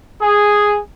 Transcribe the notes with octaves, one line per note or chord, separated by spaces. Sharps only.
G#4